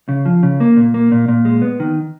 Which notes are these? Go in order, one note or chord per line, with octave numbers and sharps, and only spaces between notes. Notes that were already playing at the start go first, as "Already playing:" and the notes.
C#3
F3
C#3
A#3
A#2
A#3
A#2
A#2
G#3
B3
D#3